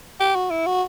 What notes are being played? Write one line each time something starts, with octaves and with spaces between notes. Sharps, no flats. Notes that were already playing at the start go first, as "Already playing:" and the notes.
G4
F#4
E4
F#4